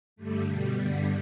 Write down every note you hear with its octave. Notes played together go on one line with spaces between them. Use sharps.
G2 D3 G3 A3
B2 G3
G2 D3 G3 B3